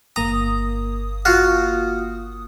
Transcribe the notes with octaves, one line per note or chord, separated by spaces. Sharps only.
G1 A#3 A#5 D#6
F4 F#4